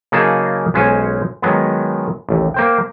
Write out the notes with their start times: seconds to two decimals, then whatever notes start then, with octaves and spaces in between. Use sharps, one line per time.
0.12 C#3 F#3 A#3 D#4 G#4 A5
0.74 B1 G#3 C#4 C5 F#5 G#5
1.42 D#3 F#3 G#3 B3
2.29 A1 D#2
2.54 A#3 C5 G5